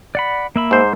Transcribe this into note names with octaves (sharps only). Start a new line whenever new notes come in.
D5 F#5 B5
A#3 E5 B5
G#2 C5